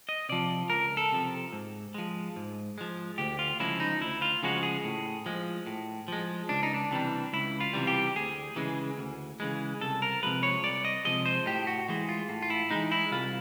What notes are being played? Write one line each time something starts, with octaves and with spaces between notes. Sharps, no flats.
D#5
C3 F3 D5
C#2 A#4
A4
C3 F3
G#2
F3 G#3
G#2
F3 G#3
D2 G4
F4
C#3 F3 G#3 E4
D#4
D2 E4
F4
C#3 F3 G#3 F#4
G#4
A2
F3 G#3
A2
F3 G#3
C#2 D4
D#4
D4
C3 E3 G3
C#2 E4
F4
C3 E3 G3
G4
D2 G#4
C#3 E3 G#3
D2
C#3 E3 G#3
C2 A4
A#4
C3 F3 G#3 B4
C#5
C2 D5
D#5
C3 F3 G#3 D#5
C5
A2 G4
F#4
E3 G#3
F4
A2
F4
E4
E3 G#3 D#4
E4
C2 F4